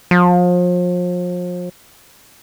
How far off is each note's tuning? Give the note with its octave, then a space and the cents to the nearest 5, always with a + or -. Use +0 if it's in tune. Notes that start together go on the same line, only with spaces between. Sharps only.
F3 +35